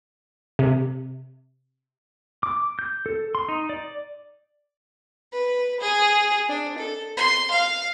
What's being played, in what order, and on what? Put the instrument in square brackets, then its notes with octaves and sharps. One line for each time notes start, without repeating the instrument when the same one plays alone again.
[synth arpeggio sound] C3
[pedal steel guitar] D6
G6
A4
C6
D#4
D5
[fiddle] B4
G#4
D4
A4
C6
F5